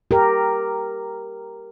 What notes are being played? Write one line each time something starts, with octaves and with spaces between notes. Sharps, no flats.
G4 A#4